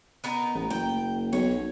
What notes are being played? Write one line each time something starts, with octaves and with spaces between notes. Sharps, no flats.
B3 D#4 A#4
A1
F#1 G5
B1 C#5